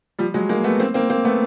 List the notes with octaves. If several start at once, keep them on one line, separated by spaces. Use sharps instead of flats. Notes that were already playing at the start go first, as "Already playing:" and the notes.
F3 G3
F#3 G#3
G#3 A#3
A3 B3
A#3 C4
A#3 C4
A#3 C4
A3 B3